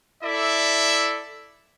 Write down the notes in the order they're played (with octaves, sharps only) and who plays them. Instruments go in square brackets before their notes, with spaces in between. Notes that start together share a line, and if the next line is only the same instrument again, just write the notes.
[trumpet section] E4 A4 D5 E5